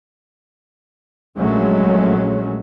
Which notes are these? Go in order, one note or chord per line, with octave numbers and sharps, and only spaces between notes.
A#1 F#3 G#3 A3 C#4